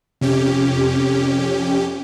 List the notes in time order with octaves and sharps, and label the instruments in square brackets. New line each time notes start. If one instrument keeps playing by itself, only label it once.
[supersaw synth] F2 C#4 G4 [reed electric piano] C3